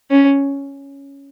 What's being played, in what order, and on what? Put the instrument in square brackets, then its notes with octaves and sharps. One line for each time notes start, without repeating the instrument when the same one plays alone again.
[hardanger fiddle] C#4